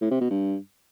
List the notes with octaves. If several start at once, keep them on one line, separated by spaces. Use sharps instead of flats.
A2
C3
B2
G2